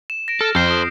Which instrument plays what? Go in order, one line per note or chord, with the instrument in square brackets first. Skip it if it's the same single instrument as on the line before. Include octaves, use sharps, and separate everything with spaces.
[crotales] E7
A#6 D7
[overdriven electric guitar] A4 [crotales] F6
[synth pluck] F2 [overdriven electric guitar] A4 C5 [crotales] G6 C7
[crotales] D#6